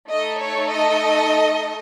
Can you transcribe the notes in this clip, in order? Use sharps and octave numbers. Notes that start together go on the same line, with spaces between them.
A3 D#4 A4 D#5
C#5
D#5